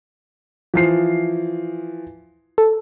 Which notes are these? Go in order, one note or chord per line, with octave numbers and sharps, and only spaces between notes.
E3 F3 C7
A4